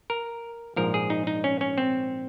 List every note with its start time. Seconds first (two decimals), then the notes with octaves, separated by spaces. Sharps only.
0.10 A#4
0.76 A#1 G#2 F3 A#4
0.94 G#4
1.10 D#4
1.27 D#4
1.44 C#4
1.61 C#4
1.78 C4